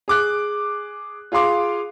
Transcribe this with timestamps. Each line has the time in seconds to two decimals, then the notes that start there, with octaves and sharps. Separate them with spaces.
0.08 G#4 D6 F#6
1.32 F4 G#4 F5 C6 D6